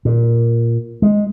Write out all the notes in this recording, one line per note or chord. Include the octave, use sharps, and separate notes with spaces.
A#2
G#3